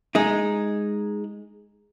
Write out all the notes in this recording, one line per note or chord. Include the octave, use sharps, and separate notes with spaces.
G#3 D#4